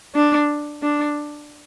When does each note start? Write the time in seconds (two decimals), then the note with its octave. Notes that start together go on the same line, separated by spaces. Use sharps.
0.15 D4
0.82 D4